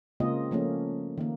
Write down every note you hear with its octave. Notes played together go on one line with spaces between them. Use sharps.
C#3 G#3 A#3 C4 F4 D#5
F3 A3 A#3 C#4
D#3 A#3